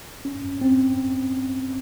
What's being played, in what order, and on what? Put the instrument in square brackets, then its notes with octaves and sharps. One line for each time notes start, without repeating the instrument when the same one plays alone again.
[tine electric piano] C#4
C4